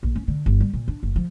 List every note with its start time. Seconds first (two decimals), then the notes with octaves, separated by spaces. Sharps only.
0.03 A#1
0.16 C#4
0.28 D3
0.46 G1
0.61 G3
0.74 A#2
0.88 D4
1.03 F#1
1.16 F3